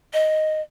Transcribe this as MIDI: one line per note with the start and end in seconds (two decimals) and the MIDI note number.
0.13 0.61 75